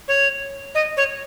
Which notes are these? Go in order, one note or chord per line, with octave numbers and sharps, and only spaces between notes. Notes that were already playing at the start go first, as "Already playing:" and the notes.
C#5
D#5
C#5